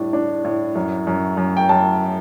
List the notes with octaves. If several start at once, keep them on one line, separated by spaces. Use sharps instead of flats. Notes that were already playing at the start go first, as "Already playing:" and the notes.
Already playing: A2 G3 D4
D4
A2
F#2
F#2
F#2
G5
F#2 A5